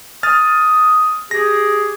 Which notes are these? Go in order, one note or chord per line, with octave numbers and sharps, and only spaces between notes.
D#6 F6 A6
G4 G#4 A#6